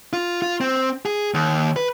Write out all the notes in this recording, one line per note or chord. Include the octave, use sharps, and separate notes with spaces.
F4
F4
C4
G#4
D#2
B4